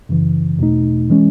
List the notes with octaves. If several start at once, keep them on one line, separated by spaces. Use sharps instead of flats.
F#2 C#3 E3
E2 B2 A3 D#4
E3 G#3 C#4